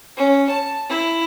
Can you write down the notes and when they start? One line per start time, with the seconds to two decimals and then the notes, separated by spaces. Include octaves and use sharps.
0.17 C#4
0.50 A5
0.89 E4